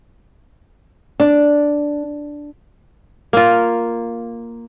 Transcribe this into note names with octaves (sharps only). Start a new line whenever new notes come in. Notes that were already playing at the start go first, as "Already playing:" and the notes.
D4
A#3 F4